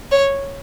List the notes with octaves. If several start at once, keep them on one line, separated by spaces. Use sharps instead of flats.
C#5